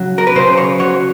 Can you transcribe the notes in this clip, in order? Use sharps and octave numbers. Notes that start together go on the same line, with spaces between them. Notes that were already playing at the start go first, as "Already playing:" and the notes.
Already playing: C#3 F#3
A#4
B4
C#3 C5
C#5
F#3 C#5